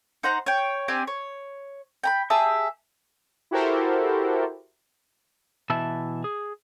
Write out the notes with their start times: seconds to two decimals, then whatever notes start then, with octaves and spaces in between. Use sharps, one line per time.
0.23 D#4 C5 F#5 A#5
0.46 C#5 G5
0.88 C4 D4 G4 G#5
1.07 C#5
2.04 G5 A#5 B5
2.30 G4 G#4 E5 A5
3.51 E4 F#4 G4 A4 A#4 C5
5.70 B2 E3 E4 E5 A5
6.24 G#4